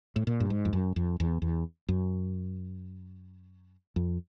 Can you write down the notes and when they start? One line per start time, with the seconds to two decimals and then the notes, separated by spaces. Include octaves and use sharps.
0.16 A2
0.27 A#2
0.40 G2
0.50 G#2
0.65 F2
0.73 F#2
0.96 F2
1.20 E2
1.42 E2
1.89 F#2
3.96 F2